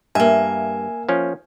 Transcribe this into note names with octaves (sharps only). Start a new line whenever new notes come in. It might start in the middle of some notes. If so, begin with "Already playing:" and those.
G2 A#3 E5 G#5
F3 C#4